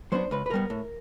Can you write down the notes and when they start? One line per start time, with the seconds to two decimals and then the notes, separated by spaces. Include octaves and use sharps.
0.12 F#3 B3 D4 C5
0.31 C#2 B4
0.46 B4
0.50 B2 G3 B3 A#4
0.70 A2